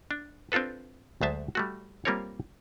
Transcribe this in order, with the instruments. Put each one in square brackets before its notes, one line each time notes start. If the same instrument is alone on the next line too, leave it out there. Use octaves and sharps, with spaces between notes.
[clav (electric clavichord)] D4
C4 D4 F4 A4 B4
D2 F#3 G#3 C5 E5 A5
G3 A3 F#4
G3 A#3 C4 F4 A#4 C#5